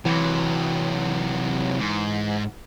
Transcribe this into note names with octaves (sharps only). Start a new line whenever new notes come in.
C3 E3 F#3
G#2